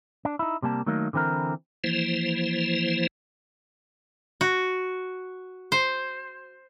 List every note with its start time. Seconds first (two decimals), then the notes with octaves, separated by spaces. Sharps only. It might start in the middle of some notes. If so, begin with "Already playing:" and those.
0.25 D4
0.39 D#4 E4
0.62 C3 G3 A#3 A5
0.86 D#3 F#3 A3 A#3 D#4
1.13 D3 E3 C4 E4 A#4
1.84 E3 F3 A#3 E4 C5
4.41 F#4
5.72 C5